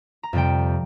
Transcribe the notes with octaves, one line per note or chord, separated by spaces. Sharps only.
A#5
F2 C3 G3 G5